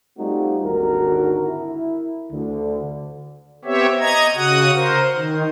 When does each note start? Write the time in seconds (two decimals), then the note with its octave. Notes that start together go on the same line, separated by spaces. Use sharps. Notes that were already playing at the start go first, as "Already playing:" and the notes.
0.18 G3 A3 C4 D#4 F4 F#4
0.64 G#1 D#2 D3 F#4 A#4
1.46 E4
2.32 D2 D3
3.65 B3 C4 G4 C#5 E5
4.00 D#5 A#5 G#6
4.36 C#3 F#4 F#5 D#6
4.74 A#4 C5
5.15 D#3